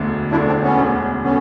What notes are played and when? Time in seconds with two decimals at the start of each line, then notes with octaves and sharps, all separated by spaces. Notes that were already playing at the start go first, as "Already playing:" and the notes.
Already playing: E1 D2 D3
0.31 E1 D2 D3 D4 E4
0.47 C4 D4
0.62 B3 C#4
0.78 E1 D2 D3
1.24 D3 B3 C#4